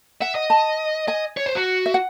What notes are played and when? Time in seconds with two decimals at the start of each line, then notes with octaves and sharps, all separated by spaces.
0.21 E5 F#5
0.35 D#5
0.50 A5
1.08 D#5 G#5
1.37 C#5
1.46 C5
1.55 F#4
1.86 E5
1.94 F#5